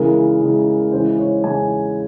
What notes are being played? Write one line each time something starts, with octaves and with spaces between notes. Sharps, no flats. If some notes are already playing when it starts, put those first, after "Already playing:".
Already playing: C#3 E3 G#3 A#4
C#3 E3 G#3
C#3 E3 G#3 C5
C#5
C#3 E3 G#3 G#5